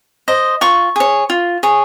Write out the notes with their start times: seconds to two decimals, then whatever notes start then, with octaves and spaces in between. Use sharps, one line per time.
0.28 C5 D#5
0.61 F4 C#6
0.96 G#4 C#5
1.30 F4
1.63 G#4 C#5